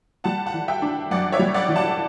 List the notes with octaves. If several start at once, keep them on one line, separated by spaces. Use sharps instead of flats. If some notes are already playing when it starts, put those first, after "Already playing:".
G3 F#5 A5
F#5 A5
E3
E5 G5
D4
F#2 D5 F#5
C#5 E5
G3
D5 F#5
E3
F#5 A5